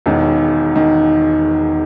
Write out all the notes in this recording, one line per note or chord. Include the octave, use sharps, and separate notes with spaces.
E1 E2 D#3
D#3